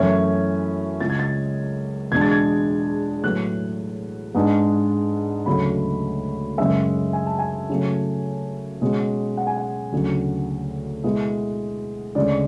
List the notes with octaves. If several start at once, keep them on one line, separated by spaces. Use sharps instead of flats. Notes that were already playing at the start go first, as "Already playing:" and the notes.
Already playing: F#2 E3 A3 C#4 E4 G#6
C#2 C#3 G#3 A6
G#6
A6
E2 B2 G#3 D4 G#6
A6
G#6
A2 F#3 B3 F#6
G#2 G#3 B3 D4
D2 C#3 F#3 A3 B5
F#2 C#3 G#3 E5
G#5
A5
G#5
C#3 F#3 A3
B2 G#3 C#4
F#5
G#5
F#5
D2 C#3 F#3
B2 G#3 B3 E4
D2 C#3 G#3 D5